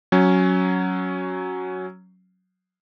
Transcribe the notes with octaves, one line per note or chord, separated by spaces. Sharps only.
F#3 C#4